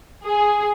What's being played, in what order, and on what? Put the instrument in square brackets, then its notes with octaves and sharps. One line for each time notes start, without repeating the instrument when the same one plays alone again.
[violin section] G#4